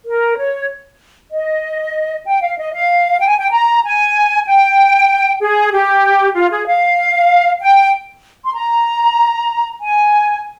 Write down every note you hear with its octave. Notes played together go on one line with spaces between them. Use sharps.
A#4
C#5
D#5
G5
F5
D#5
F5
G5
G#5
G5
A#5
G#5
G5
G#4
G4
F4
G#4
F5
G5
C6
A#5
G#5